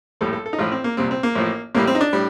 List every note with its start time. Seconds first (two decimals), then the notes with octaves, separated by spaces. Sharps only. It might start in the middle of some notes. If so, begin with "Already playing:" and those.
0.21 A#1 A2 G3 A4
0.33 A4
0.46 A4
0.53 D#4
0.59 A1 A2 F3 F4
0.72 C4
0.84 A#3
0.97 C2 A#2 G3 C4
1.11 C4
1.23 A#3
1.35 A1 A2 F3
1.75 A1 A2 G3 A#3
1.87 C4
1.95 D#4
2.01 D4
2.13 A2 G3